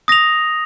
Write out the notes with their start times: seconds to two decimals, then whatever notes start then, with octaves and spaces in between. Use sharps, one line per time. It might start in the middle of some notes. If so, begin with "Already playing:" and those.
0.08 D#6 A#6 F7